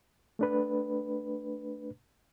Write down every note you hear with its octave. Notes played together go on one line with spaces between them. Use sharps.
A3 D4 B4